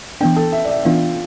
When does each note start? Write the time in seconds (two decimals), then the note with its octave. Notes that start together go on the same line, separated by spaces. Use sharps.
0.21 E3 B3 D4 G5
0.36 A4
0.52 E5
0.65 D5
0.69 E5
0.85 E3 B3 D4 F4